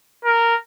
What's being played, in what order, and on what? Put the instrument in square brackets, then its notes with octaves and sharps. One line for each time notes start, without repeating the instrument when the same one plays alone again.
[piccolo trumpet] A#4